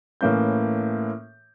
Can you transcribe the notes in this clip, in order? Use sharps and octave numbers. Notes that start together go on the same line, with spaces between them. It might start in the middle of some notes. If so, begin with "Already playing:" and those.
A2 E3 A#3 C#4 G6